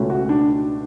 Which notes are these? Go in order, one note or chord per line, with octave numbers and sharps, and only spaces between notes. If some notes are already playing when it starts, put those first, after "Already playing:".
Already playing: C#2 B2 A3 C#4
F#4
D4